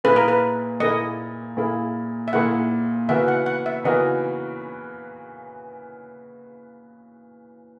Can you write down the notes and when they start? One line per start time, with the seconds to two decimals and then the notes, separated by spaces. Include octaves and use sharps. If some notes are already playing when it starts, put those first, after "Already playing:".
0.04 A#2 A#3 E4 G#4 B4
0.16 A#4
0.28 B4
0.80 A#2 A#3 E4 G#4 D#5
1.57 A#2 A#3 E4 G#4
2.28 E5
2.33 A#2 A#3 E4 G#4 F#5
3.08 C#3 E3 B3 F#4 A#4 E5
3.28 F#5
3.46 F#5
3.66 E5
3.84 C#3 E3 B3 F#4 A#4 D#5